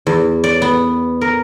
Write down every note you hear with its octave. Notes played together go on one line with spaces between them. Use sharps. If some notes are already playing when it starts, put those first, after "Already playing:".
E2
D5
B3
A#4